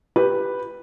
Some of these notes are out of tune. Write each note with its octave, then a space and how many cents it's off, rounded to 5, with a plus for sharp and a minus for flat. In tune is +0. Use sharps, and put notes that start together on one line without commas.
G4 +0 B4 +0